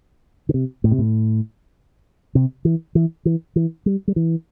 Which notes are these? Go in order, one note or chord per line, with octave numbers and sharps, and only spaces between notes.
D3
C3
A2
C3
A2
C3
E3
E3
E3
E3
G3
G3
E3